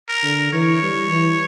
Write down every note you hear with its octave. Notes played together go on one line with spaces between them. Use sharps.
A#4
D3
E3 C#5
G3
E3